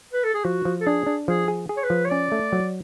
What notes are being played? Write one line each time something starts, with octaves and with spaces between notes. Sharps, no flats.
B4
A4
G#4
F3 F#4
F3
A4
D4 G#4
D4
F3 G#4
G#4
G#4
C#5
B4
F3
C#5
C#4 D5
A3
F#3